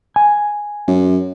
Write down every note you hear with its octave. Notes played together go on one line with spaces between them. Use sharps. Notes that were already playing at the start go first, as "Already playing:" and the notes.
G#5
F#2